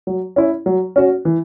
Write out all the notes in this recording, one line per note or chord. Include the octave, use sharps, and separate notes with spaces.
F#3
C#4 E4
F#3
C#4 F#4
E3